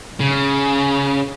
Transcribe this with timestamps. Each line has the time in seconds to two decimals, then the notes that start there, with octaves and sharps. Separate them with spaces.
0.20 C#3